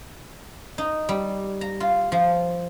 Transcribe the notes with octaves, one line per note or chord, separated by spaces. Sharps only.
D#4
G3
A#5
F4
F3